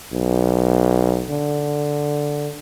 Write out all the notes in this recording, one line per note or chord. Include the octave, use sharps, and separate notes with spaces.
B1
D3